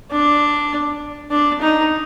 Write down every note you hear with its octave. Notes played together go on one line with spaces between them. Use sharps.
D4
D4
D#4